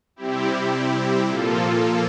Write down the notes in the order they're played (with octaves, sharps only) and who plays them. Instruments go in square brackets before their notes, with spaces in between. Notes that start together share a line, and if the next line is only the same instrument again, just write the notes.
[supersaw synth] C3 G3 C4 E4 G4
A#2 F3 A#3 F4 A4